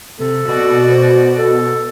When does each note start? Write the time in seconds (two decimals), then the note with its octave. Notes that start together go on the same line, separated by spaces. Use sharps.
0.20 C3 A4
0.48 B2 F#4 D5
0.88 C5
1.37 A4